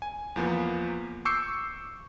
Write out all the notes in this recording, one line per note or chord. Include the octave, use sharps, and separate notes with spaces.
G#5
E2 F3 A#3 B3
C#6 D6 E6 G6 C7 C#7